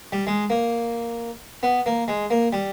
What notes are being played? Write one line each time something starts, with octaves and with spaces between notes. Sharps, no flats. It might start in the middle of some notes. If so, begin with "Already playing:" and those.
G3
G#3
A#3
B3
A#3
G#3
A#3
G3